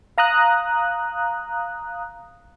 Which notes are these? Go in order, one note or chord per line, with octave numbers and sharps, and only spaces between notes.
F5 A#5 D#6 F#6